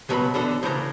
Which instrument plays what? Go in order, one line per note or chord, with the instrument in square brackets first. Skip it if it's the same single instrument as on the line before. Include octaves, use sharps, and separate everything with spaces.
[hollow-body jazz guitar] C#2 B2 F#3 A#4 B4 B5
E2 B2 D3 A4
A2 C#3 E3 C5 G#5 A#5